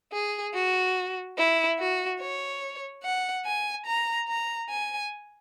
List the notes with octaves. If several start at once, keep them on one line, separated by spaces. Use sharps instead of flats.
G#4
F#4
E4
F#4
C#5
F#5
G#5
A#5
A#5
G#5